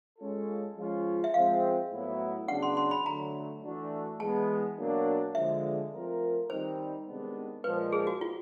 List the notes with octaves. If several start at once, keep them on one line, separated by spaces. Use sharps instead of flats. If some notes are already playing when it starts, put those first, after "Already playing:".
G#3 C#4 F4 A4
F3 G#3 C#4 F4
E5
F3 G#3 C4 F5
A2 F#3 B3 E4
C#3 F#3 B3 D4 F#5
C6
C6
B5
D3 F#3 A3 A#5
E3 A3 D4 F#4
E3 G#3 B3 A5
B2 F#3 A#3 D4
D3 F3 G#3 E5
F3 A3 C4 F4 A#4
D#3 G3 C4 D#4 C5
C3 D#3 G#3 B3 D4
A#2 F3 G#3 B4
G#4
F#4
F4